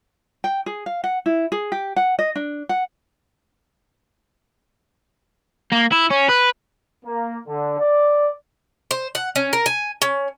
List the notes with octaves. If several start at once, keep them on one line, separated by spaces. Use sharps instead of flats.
G5
G#4
F5
F#5
E4
G#4
G4
F#5
D#5
D4
F#5
A#3
E4
C#4
B4
A#3
D3
D5
C5
F#5
C#4
A#4
G#5
C#4